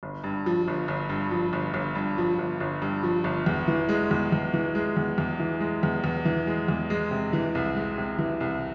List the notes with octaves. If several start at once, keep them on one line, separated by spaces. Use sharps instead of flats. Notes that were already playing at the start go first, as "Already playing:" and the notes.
G1
G2
F3
G1
G1
G2
F3
G1
G1
G2
F3
G1
G1
G2
F3
G1
E2
E3
G#3
E2
E2
E3
G#3
E2
E2
E3
G#3
E2
E2
E3
G#3
E2
G#3
C3
E3
C2
G#3
C3
E3
C2